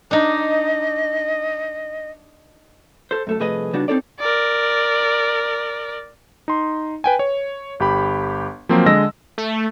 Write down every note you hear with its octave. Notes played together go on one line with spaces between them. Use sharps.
D4 D#4 D#5
A4 C5
F#2 A3 A4
C2 F2 A3 G#4 B4 D#5
C#3 G3 B3 D4 D#4 F#4
C4 D4 D#4 A4 C#5 D5
A#4 D5
D#4 C6
B4 G5 G#5
C#5
G1 G4 B5
F3 F#3 A#3 C4 F4
D3 G#3 D#5 E6 A#6
A3